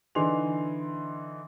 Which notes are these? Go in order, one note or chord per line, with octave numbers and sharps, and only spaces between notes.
D3 E3 D#4 C6 F7